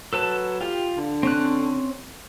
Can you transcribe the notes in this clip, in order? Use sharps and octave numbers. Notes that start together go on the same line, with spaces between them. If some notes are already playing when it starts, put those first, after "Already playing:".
F#3 A4 B4 A5
F4 G4
D3
C4 C#4 F#6